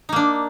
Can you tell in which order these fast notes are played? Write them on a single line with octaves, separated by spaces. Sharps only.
D#4 A#3 D4